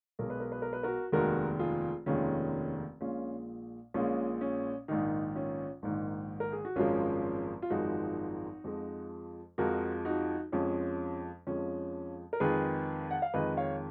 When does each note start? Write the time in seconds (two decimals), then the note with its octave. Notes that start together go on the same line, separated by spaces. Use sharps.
0.19 B1 B2 G#3 A#4
0.30 B4
0.40 A#4
0.52 B4
0.62 A#4
0.73 B4
0.83 F#4 A#4
1.12 F1 D#2 D#3 G#3 F#4 A#4
1.59 F4 G#4
2.06 F1 D#2 D#3 G#3 C#4 F4
3.01 A#1 A#2 G#3 C#4 F4
3.94 A#1 A#2 G#3 C#4 F4
4.41 C#4
4.88 A#1 G#2 D#3 D#4
5.35 C#4 F4
5.83 A#1 G#2 D#3 D#4
6.40 A#4
6.52 G#4
6.65 F#4
6.76 G#1 F#2 F3 G#3 C#4 F4
7.62 F4
7.70 G#1 F#2 F3 G#3 D#4 F#4
8.64 F2 F3 G#3
9.58 F2 F3 G#3 F#4 A#4
10.05 D#4 F#4
10.52 F2 F3 G#3 C#4
11.47 F2 F3 G#3 C#4
12.33 A#4
12.40 F2 D#3 G#3 G#4 B4
13.11 F#5
13.22 F5
13.34 F2 D#3 G#3 B4 D#5
13.57 C#5 F5